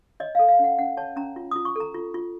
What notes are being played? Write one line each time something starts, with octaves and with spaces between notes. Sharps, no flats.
C#5 D#5
A4 F5
F5
C#4 F#5
C#4 F#5
C#5 A5
C#4 A#5
F4
F4 D#6
C#6
A4 A#5
F4
F4